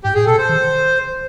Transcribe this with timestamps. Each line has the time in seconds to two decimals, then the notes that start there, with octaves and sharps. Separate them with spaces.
0.04 G#2 G4
0.15 A2 G#4
0.26 B2 A4
0.38 C5
0.49 D#3